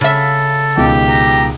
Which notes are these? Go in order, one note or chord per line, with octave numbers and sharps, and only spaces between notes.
C#3 A4 E5
C#2 B2 D#3 G4
A#5